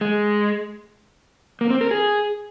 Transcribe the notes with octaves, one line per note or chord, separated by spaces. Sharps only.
G#3
A#3
C4
A#4
G#4